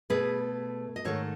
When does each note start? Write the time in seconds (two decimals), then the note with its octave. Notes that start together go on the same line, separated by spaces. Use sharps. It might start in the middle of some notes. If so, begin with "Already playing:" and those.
0.10 B2 A3 G#4 B4
0.96 D#5
1.05 G#2 D#3 A3 A4 C#5